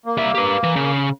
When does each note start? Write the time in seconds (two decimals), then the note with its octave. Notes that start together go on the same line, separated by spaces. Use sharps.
0.06 A#3
0.17 G3 E5
0.35 G4 B4
0.63 E3
0.76 C#3